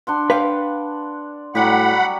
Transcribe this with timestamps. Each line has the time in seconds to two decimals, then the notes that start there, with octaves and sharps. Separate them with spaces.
0.07 D4 F#5 C6
0.30 B4 F5 G5
1.55 A2 F#3 G3 G4 F#5 B5